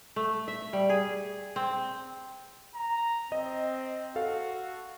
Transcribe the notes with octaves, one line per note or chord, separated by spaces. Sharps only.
A3
E5
G3
G#4
C4
A#5
C4 D#5
F#4 A4 F5